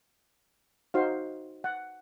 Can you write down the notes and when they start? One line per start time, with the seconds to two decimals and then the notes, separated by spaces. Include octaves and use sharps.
0.94 D#4 F#4 C5 F5
1.64 F#5